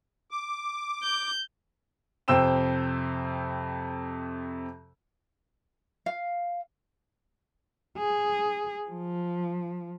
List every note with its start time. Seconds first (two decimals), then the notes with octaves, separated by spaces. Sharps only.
0.31 D6
1.03 G6
2.28 F2 C3 C5 G5 E6 E7
6.06 F5
7.98 G#4
8.89 F3